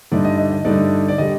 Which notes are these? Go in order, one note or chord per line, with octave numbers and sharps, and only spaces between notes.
G2 D3 A3 D#4 D5
D#5
D#5
D#5
G2 D3 A3 D#4 D5
D5
D3 G3 D#5